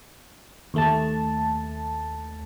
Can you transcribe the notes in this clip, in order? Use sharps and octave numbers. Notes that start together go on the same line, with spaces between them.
D#2 A3 A5